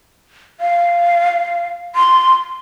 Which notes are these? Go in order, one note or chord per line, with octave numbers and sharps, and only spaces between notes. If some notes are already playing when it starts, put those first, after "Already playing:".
F5
C6